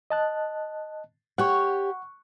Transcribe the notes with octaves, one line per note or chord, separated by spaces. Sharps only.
D#5 A5 F#6
G4 C#5 F#5 C#6 F#6